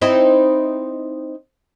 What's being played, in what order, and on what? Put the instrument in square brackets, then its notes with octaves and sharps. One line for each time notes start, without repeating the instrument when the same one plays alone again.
[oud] C4 D#4 E4